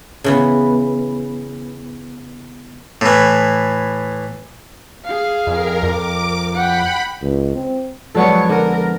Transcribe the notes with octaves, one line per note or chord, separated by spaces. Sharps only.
C#3 E3 B3
A2 E3
G#4 F5
F2 A#4
F2 A#4 D6
F#5 G5 B5
C#2
C4
F2 F#3 G#3 B3 A4 C#5 D5
D3 A#4